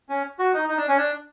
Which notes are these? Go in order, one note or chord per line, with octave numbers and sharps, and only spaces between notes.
C#4
F#4
D#4
D#4
D4
C#4
D4